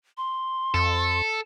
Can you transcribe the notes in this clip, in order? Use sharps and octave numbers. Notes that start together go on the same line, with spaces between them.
C6
F2 A4